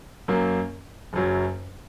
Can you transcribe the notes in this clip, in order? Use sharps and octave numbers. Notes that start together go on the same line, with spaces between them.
F#2 F#3 A#3
F#1 F#2 F#3